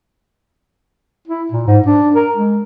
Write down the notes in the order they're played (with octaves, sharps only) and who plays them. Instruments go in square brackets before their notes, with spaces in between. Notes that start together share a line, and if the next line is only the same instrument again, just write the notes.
[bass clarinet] E4
A#2
G#2
D4
A#4
G#3